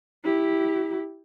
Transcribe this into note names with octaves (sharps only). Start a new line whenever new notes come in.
E4 G4